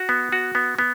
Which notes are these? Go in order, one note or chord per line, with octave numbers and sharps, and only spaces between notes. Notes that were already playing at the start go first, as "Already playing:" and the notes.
Already playing: F#4
B3
F#4
B3
B3